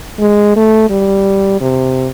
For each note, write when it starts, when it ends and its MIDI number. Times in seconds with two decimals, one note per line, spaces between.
0.20 0.52 56
0.56 0.86 57
0.90 1.56 55
1.61 2.08 48